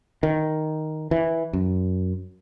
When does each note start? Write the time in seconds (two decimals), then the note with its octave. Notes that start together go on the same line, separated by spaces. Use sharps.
0.23 D#3
1.11 E3
1.53 F#2